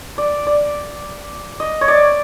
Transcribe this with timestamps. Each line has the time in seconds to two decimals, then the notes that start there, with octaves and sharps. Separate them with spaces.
0.18 D5
0.47 D5
1.60 D#5
1.81 C#5
1.88 D5